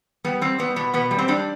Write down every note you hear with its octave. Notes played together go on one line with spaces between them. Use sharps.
G3 B3
G3 C4
G3 B3
B2 B3
B2 B3
G3
C4
G3 D4